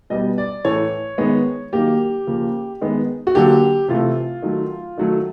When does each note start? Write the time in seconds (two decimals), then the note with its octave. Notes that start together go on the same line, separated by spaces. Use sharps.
0.10 B2 G3 B3 D#5
0.38 D5
0.65 A2 E3 A3 C#5
1.18 D#3 G#3 B3
1.73 D#3 F#3 A#3 G4
2.27 C#3 F3 A#3
2.81 D#3 G#3 B3
3.27 F#4
3.35 D3 F#3 A#3 G4
3.88 C3 E3 A3 F4
4.42 D#3 F#3 A3
4.97 D#3 F#3 A3